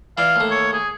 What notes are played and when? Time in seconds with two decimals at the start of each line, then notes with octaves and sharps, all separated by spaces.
0.18 E3 D5 F5
0.36 D#2 A3
0.51 C#5
0.73 G#4